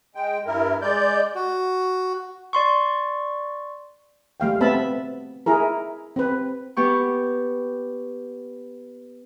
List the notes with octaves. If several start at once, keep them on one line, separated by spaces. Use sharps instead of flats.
G#3 G5
G2 E4 A#4
G#3 D5 G6
F#4
D5 C6 C#6
G3 A3 F5 G5
A3 B3 C4 E5 A5 B5
E4 G#4 A#4
C4 B4
B3 G4 C#6